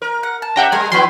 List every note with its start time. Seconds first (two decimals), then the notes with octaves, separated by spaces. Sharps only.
0.02 A#4
0.23 F#5
0.42 A5
0.56 C#4 G4 E5 F#5 G5 A#5
0.72 G3 G#3 A#4 G#5
0.92 F3 B3 E4 B4 G5 G#5 C6